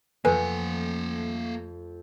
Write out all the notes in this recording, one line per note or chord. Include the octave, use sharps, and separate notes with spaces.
F2 F3 A3 A#3 A4 B4 F#5 G#5